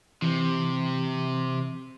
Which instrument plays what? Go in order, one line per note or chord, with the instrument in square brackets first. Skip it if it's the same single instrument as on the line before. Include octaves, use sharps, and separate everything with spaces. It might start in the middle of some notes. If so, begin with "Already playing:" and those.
[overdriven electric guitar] C3 [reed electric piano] E3